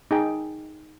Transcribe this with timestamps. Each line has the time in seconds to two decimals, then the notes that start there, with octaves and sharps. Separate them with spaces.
0.11 D#4 G#4 G5